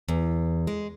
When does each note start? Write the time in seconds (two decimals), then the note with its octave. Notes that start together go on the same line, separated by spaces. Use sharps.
0.09 E2
0.67 G#3